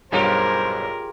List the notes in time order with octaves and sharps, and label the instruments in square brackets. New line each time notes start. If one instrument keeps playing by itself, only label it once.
[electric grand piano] B1 G2 C#5 [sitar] F4 G4 G#4 [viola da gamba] A#4 [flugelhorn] C5